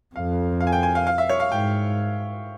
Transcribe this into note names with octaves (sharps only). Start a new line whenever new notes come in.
F2 F5
F5
G#5
G5
G#5
F5
F5
E5
C#5
F5
G#2 G5